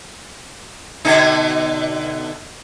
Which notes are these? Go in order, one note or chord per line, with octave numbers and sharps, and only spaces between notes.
B2 D3 D#4